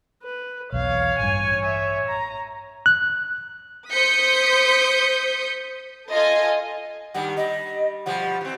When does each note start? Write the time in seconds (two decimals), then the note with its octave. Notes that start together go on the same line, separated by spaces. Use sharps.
0.23 B4
0.73 B1 E2 C#5 F5
1.19 A1 G2 G#5
1.65 E5
2.08 A#5
2.86 F#6
3.92 C5 D#6 G6 B6 C#7
6.12 F4 A4 D#5 G#5
7.14 G2 D#3 G3 F#5
7.37 G3 D#5
8.06 B2 F3 G3 F#5
8.41 E3 C4